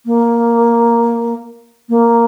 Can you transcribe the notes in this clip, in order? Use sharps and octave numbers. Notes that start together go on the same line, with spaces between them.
A#3
A#3